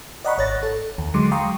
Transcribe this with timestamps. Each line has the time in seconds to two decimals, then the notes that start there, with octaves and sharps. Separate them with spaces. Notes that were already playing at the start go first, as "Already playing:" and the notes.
0.24 D5 D#5 F#5 A#5 B5 C#6
0.38 G#1 C#5 F#6 A6 A#6
0.63 A4
0.98 D#2
1.14 D3 F#3 G#3 C6 D6
1.32 F5 G5 A#5 C6 C#6 D#6